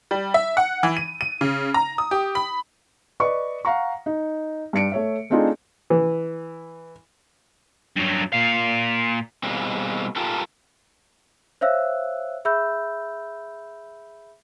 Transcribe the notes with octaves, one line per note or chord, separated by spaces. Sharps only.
G3
E5
F#5
E3
D#7
D#7
C#3
A#5
D#6
G4
B5
B4 D5 D#5 C#6
F5 F#5 A#5 C#6
D#4
G2 D4 C#7 D7
A3 C#5 E5
A3 C4 D4 D#4 F4 G#4
E3
G2 F#3
A#2 F5
B2 G3 G#3 A#3 C4
F4 G4 A4 A#4
C5 C#5 E5 F5 E6 F#6
G#4 E5 B5 E6 G6